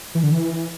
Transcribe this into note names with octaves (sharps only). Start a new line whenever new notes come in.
E3
D3
E3